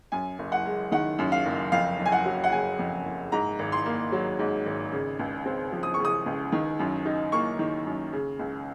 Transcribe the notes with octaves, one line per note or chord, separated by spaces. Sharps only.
F#2 G#5
F#1
F#5
G#3
D#3 F#5
F#2
F5
F#1
F2 F5
F#1
G#5
F#5
F#3
F#5
C#3 G#5
F2
F#1
G#2 A#5
G#1
C6
A#3
F#3
G#2
G#1
C#3
C#2
C4
F3
D#6
C#6
C#3
D#6
C#2
D#3
F#2
D#4
A#3 C#6
D#3
F#2
C#3
C#2